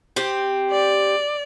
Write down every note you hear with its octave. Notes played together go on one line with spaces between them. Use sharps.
C4 G4
D5